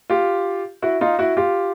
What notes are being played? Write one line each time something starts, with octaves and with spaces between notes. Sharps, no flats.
F4 G4
E4 F#4
D#4 F4
E4 F#4
F4 G4